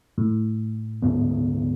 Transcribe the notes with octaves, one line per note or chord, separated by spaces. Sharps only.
A2
D2 G#2 B3